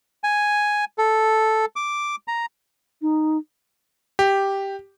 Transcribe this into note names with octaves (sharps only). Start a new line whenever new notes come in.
G#5
A4
D6
A#5
D#4
G4